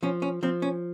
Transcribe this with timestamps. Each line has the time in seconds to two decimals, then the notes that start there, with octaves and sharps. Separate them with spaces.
0.03 F3 C#4
0.22 C#4
0.43 F3 C4
0.62 C#4